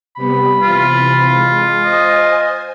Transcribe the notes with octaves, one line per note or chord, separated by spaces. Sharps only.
C3 G3 B3 B5
C3 E3 F4
G#3
C5 D#5 G#5